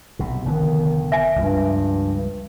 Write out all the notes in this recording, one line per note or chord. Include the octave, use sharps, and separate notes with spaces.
B1 C3
F1 D3 D#3 B3
E5 G#5
C#2 G2 F3 G3